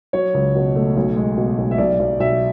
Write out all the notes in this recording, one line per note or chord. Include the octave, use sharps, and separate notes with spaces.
F#3 C#5
C#2
B2
A3
B1
G#3
B2
B1
E5
B1 D5
B1
B1 E5